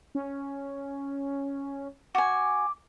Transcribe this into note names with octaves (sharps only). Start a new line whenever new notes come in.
C#4
F#4 G#5 D6